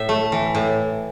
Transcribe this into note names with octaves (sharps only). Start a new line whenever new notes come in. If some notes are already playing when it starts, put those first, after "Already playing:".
Already playing: A2 E5
A3
E3
A2